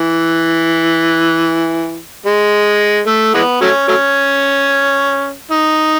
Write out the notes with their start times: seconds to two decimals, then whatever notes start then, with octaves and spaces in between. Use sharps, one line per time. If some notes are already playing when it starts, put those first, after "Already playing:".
Already playing: E3
2.26 G#3
3.07 A3
3.34 E3 G#3 B3
3.61 F#3 A3 C#4
3.88 F#3 A3 C#4
5.51 D#4